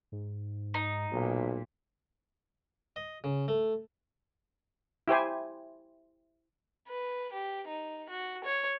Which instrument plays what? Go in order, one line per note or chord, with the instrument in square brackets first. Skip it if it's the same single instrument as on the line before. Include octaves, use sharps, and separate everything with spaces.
[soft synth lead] G#2
[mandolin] D#4
[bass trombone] B1 [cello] A#2
[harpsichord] D#5
C#3
A3
[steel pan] E4 G4 C5 G#5
[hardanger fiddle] B4
G4
D#4
F#4
C#5